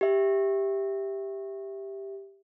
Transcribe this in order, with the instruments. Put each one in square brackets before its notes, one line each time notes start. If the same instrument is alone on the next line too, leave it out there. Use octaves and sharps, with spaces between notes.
[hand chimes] G4 E5